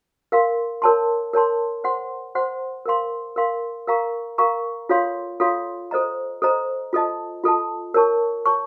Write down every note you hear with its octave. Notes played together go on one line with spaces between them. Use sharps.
A#4 F5 C6
A#4 C#5 A5 C6
A#4 C#5 A5 C6
C5 F#5 C6
C5 F#5 C6
A#4 F5 C6
A#4 F5 C6
A#4 F5 A#5 C#6
A#4 F5 A#5 C#6
F4 A4 C#5 F5 C6
F4 A4 C#5 F5 C6
A4 C5 D#5 A#5
A4 C5 D#5 A#5
F4 A4 D#5 A5
F4 A4 D#5 A5
A#4 C#5 A5 C#6
A#4 C#5 A5 C#6